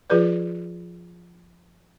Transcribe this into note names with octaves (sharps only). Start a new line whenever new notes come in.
F3 F4 G#4 B4 D5